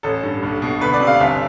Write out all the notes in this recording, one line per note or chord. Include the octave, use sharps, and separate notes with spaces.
A1 A4
G2
B1
B2
D2 B4
D5
C3
F5
G1 E5